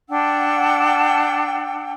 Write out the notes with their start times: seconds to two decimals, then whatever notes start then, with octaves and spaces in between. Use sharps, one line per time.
0.10 D4 F#5 G5 E6